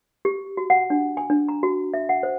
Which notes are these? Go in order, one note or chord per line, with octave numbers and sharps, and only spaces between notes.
G4
F#4
F#5
D4
G#5
D4
A#5
F#4
E5
F#5
C5